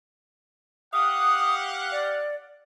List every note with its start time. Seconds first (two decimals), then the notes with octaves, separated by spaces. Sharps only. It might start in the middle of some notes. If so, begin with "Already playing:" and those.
0.93 G4 F5 F#5 D#6
1.92 D5